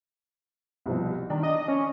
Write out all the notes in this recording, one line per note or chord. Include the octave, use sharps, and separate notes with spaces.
C2 B2 F3
D#3 D4
D#5
C#4